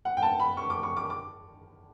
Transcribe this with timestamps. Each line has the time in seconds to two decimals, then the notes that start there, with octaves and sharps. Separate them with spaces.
0.05 F#5
0.17 G5
0.22 A5
0.40 B5
0.57 C#6
0.70 D6
0.83 C#6
0.97 D6
1.10 D6